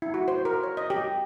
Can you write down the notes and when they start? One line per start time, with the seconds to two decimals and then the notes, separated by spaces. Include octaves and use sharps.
0.02 E4
0.14 F#4
0.28 C5
0.45 A#4
0.63 C#5
0.77 D#5
0.90 G4